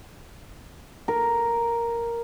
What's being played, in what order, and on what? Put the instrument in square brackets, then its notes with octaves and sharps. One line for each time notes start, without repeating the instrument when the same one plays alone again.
[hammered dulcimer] A#4